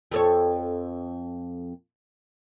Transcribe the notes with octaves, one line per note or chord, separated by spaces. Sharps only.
F2 A4 C#5